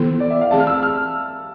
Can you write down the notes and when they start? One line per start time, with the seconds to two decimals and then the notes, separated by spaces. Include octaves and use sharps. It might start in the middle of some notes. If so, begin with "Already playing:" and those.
Already playing: E3 B3 E4 A4
0.20 D5
0.30 E5
0.41 F5
0.51 E3 A3 C4 G#4 A5
0.60 F6
0.67 E6
0.83 F6